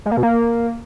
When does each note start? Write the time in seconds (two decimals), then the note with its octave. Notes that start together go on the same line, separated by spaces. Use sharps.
0.06 G#3
0.11 A#3
0.17 B2
0.23 A#3